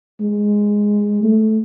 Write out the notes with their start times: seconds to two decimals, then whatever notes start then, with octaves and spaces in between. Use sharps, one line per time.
0.20 G#3
1.23 A3